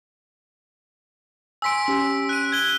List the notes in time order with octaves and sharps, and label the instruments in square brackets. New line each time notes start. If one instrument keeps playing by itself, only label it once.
[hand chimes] G#5 C6 [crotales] E6 B6 D7
[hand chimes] C#4 G4
[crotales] F#6 D#7
G#6 G7